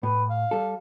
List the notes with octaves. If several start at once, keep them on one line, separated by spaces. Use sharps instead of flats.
A2 B4
F5
G3 A4